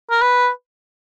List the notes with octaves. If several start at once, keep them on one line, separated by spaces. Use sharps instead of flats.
A#4
B4